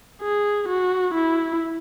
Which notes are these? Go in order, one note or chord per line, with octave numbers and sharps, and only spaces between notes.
G#4
F#4
E4